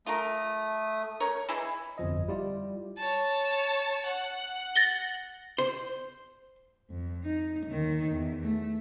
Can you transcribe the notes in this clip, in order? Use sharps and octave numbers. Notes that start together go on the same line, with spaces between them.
A3 F4 A#4 D#6
A#4 C#5
E3 G#3 E4 G#5
G1 F2 F3 D#5
G3 E4 F4 G4 D5
C#5 A5
F#5
A6 A#6 G7
C5
F2
D#4
D#2 D#3
E2
A3